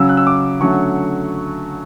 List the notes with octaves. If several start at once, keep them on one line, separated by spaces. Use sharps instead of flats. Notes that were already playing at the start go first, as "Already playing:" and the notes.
Already playing: C#3 F#3 C#4 E6
F#6
E6
D6
D3 F#3 A3 C#4 C#6